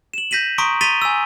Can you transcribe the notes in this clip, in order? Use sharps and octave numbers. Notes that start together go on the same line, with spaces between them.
E7 F#7
G6 A#6 B6 D#7 F#7
A#5 C6 C#6 D#6 B6 D7
C6 A6 B6 D#7 F7 G7
G#5 E6